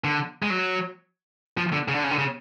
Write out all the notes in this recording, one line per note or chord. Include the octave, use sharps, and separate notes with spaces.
D3
G#3
F#3
F3
D3
C#3
D3
C#3
D3
C#3